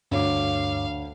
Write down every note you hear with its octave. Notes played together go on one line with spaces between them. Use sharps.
D2 G2 C#5 F5 D6